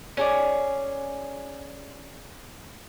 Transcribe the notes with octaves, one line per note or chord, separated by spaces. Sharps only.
C#4 G#4 D5